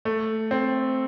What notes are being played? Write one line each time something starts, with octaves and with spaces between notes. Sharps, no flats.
A3
C4